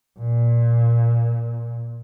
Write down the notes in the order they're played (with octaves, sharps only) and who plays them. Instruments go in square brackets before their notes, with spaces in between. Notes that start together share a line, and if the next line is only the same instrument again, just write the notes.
[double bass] A#2